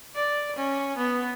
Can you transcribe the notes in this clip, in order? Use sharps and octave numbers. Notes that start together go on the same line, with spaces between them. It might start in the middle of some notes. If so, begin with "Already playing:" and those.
D5
C#4
B3